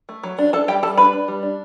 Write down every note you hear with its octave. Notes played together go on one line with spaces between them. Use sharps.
A3
F#3
D4
D4 A4 A5
G3 G4 G5
G3 A4 A5
D4 B4 B5
D4
G3
D4